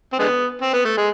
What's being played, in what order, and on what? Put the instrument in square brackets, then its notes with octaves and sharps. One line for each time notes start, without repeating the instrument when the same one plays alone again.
[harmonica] C4
D3 G#3 B3
C4
B3
A3
G#3